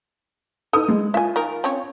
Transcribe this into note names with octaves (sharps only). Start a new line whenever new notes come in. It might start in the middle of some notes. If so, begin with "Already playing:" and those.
D#4 A4 B4 D#6
G#3
F4 E5 G#5
D#3 A#4
C4 C#4 C#5